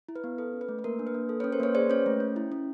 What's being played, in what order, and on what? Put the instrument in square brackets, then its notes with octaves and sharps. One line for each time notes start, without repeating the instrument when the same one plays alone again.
[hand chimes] E4
B4
B3
A4 B4
C#4
B4
A3
B4
A#3 A#4
D4
B4
A#3
A4
B4 C#5
C#4
A#4 C5
A#3 B4 C#5
G#4 C5 D5
C#4 B4 C#5
A3
C#4
E4
C#4